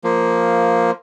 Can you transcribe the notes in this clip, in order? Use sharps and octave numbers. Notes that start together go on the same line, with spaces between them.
F3 A#3